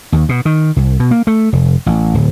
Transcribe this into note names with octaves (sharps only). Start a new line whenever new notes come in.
D#2
B2
D#3
C2
B2
A#3
A3
F1
A1
D1